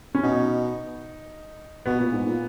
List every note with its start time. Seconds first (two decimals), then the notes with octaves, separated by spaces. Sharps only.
0.15 C#4
0.23 B2 D#4
1.86 B2 B3
2.00 A#2
2.12 G#2
2.25 A#2